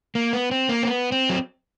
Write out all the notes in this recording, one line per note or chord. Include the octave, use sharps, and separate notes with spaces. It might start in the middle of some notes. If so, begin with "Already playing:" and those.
A#3
B3
C4
A#3
C4
B3
C4
F#3